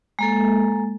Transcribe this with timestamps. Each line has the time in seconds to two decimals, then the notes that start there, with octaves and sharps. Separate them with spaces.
0.19 G#3 A#3 A4